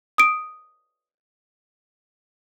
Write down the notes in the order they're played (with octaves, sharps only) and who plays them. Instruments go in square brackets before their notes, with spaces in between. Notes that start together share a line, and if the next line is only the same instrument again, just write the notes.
[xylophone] D#6 D7